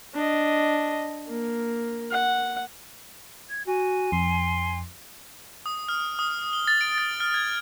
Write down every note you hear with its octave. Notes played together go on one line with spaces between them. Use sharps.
D4 D#5
A#3
F#5
G#6
F#4 G#5
F2 C6
D#6
F6
D#6
G7
A6
D7
A6
F6
G#6